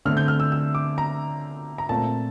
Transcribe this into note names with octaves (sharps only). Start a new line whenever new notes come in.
D3 A3 C4 F6
G6
F6
E6
E6
D6
A#5
A#5
A#2 A3 C4 A5